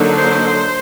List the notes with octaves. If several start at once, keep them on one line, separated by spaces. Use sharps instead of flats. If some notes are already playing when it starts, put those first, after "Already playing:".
Already playing: D3 F#3 A#3 D#4
C5